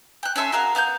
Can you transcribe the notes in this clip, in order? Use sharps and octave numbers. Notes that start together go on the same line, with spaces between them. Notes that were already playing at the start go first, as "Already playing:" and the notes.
G5 F#6
C#4 A4 E5 C6
F#4 G#4 A#4 F5
B3 F5 G#5 G6